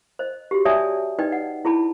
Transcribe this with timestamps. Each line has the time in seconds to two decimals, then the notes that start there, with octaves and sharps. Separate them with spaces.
0.19 C5 D#5
0.51 F#4 G4
0.65 C#5 D5 E5 G#5 A5 D#6
1.19 D#4 B4 D5 D#5 G5
1.32 F#5
1.65 E4 G#4 A5 B5